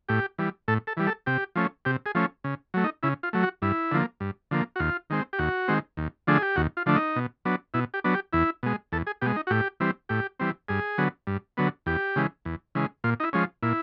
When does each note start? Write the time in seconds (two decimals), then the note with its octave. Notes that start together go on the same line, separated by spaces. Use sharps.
0.09 A2 G4
0.38 E3 G3
0.68 A2 A4
0.87 A4
0.97 E3 G3
1.07 A4
1.26 C3 G4
1.56 F3 A3 C#4
1.85 C3 G4
2.06 G#4
2.15 F3 A3 C#4
2.44 C#3
2.74 F#3 A3
2.84 D#4
3.03 C#3 E4
3.23 F4
3.33 F#3 A3
3.43 F#4
3.62 G2 E4
3.92 D3 F3 A#3
4.20 G2
4.51 D3 F3 A#3
4.76 F#4
4.79 D#2 F4
5.10 D#3 G#3 C4
5.33 G4
5.39 D#2 F#4
5.68 D#3 G#3 C4
5.97 D#2
6.27 D3 F3 A3 D4 G#4
6.42 G4
6.56 D#2 F#4
6.77 F4
6.86 D3 F3 A3 D4
6.96 D#4
7.16 B2
7.45 F#3 B3 D4
7.74 B2 E4
7.94 G4
8.04 F#3 B3 D4
8.14 G4
8.33 E2 E4
8.63 B2 G#3
8.92 E2 A4
9.07 G#4
9.21 B2 G#3 G4
9.36 D#4
9.47 F#4
9.50 A2 G4
9.80 E3 G3 C4
10.09 A2 G4
10.39 E3 G3 C4
10.69 G2 G#4
10.98 D3 F#3 B3
11.27 G2
11.57 D3 F#3 B3
11.86 E2 G4
12.16 C#3 E3 G#3
12.45 E2
12.75 C#3 E3 G#3
13.04 A#2 F4
13.20 D#4
13.23 E4
13.33 F3 G#3 C#4
13.63 A#2 E4